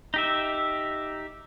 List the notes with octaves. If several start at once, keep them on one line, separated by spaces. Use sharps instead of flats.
D#4 G4 E5